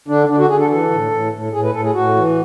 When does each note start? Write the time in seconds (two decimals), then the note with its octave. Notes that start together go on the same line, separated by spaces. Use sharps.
0.08 D3 D4
0.29 D3 D4
0.39 F#4
0.49 D3 G#4
0.60 A4
0.70 E3 A4
0.91 A2
1.12 A2
1.33 A2
1.53 A2 G#4
1.64 B4
1.74 A2 A4
1.84 G#4
1.94 A2 F#4
2.15 E3